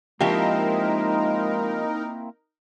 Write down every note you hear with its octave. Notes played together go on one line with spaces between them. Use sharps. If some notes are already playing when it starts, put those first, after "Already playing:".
F3 G#3 A#3 C4 D#4 E4 G4 A#4